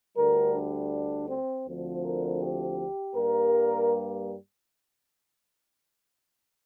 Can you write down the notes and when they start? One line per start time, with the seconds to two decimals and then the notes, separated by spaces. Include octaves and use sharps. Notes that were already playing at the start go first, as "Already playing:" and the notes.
0.17 D2 D3 G3 A#4
0.54 D4
1.29 C4
1.66 D2 D3 F3 C4
2.04 A#4
2.41 G4
3.15 G2 G3 A#3 A#4